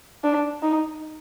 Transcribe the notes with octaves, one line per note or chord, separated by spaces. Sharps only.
D4
D#4